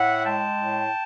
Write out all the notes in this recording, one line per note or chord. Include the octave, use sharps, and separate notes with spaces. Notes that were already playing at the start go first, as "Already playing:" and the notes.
Already playing: A2 E5 F#5
G#3 G5 A5
A2